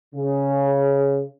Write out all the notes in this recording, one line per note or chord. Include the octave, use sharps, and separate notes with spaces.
C#3